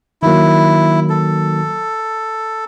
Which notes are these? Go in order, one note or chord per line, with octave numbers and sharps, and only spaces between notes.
D#3 F#3 A#3 E4
A4